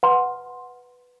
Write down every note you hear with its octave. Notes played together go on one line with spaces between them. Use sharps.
B4 F#5 C6